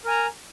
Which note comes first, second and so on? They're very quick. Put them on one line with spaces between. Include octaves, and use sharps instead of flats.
A#4 G#5 A#5